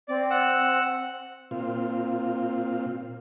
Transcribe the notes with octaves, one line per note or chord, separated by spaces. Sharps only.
C4 D5
F#5 E6
A#2 C4 F4